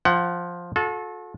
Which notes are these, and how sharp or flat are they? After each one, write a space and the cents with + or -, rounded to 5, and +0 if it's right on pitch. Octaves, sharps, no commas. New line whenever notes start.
F3 +5 F#5 +30
F#4 -45 A4 -20